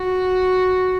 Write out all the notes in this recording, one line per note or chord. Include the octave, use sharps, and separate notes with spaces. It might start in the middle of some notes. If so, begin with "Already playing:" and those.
Already playing: F#4